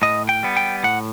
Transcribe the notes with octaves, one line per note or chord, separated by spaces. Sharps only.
A2 D#5
G5
G3 B3
G5
A2 F#5